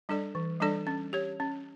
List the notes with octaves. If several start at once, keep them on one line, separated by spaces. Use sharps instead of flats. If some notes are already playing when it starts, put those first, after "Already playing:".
G3 D4 A4 D5
E3
G3 D4 A4 D5
C#4
G4 C#5
C#4